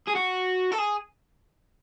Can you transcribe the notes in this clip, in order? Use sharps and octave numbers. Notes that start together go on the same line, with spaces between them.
G#4
F#4
A4
G#4